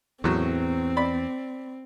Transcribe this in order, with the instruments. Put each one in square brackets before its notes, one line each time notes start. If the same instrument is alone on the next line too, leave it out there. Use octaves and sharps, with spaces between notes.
[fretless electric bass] E2 [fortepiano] A2 F#3 [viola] C4
[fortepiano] D5 B5